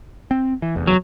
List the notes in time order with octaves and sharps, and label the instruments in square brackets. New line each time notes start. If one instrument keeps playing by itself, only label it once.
[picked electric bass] C4
E3
F1 E2
[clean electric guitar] F#3